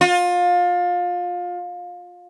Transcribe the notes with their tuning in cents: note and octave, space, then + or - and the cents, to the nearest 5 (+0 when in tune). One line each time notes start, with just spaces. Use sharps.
F4 +25